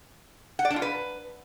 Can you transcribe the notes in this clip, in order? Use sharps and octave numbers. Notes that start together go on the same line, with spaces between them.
F#5
D5
D4
F4
B4